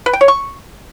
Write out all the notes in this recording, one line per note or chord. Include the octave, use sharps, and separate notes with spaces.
B4
G5
C#5
C#6